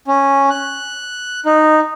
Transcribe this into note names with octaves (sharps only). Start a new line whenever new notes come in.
C#4
F#6
D#4